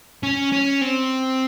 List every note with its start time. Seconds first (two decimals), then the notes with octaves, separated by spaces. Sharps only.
0.23 C#4
0.52 C#4
0.81 C4